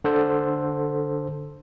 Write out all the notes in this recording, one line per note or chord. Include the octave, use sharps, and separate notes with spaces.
D3 A4 C5